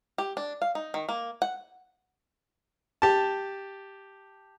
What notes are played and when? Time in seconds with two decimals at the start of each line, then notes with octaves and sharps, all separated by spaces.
0.18 G4
0.37 D4
0.62 F5
0.75 D#4
0.94 D#3
1.09 A#3
1.42 F#5
3.02 G4 A5